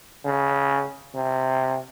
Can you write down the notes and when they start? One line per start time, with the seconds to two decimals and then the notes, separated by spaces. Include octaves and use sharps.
0.25 C#3
1.15 C3